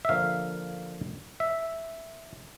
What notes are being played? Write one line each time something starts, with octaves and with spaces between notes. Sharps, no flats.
E5
D3 F3 A#3 F5
E5